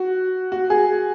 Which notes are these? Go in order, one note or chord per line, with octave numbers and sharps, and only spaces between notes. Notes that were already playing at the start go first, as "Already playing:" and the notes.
Already playing: F#4
F#4
G#4